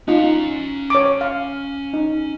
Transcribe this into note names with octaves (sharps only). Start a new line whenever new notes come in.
C#4 D#4 F4 A#5
C#5 D6
F5
D#4